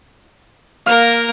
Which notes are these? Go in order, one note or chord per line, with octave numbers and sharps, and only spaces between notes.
A#3 A#4 F5